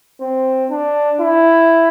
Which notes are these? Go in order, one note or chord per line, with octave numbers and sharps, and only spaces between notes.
C4
D4
E4